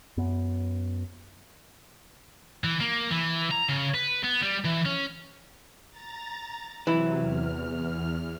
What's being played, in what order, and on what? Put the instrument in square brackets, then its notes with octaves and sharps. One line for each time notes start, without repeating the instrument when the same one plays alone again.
[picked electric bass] F#2 B3
[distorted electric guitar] E3
A#3
E3
A#5
C#3
B4
B3
G3
E3
C#4
[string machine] A#5 A6
[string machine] C3 F#3 [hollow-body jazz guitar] E3 E4
[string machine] E2 F6